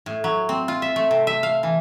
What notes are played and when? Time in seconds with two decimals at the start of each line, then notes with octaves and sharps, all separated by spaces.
0.06 A2
0.24 F#3
0.49 C4
0.68 F4
0.82 E5
0.96 A3
1.11 C3
1.27 E5
1.43 F5
1.63 E3